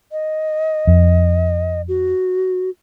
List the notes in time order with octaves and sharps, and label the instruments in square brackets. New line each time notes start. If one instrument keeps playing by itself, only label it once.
[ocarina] D#5
[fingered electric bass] F2
[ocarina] F#4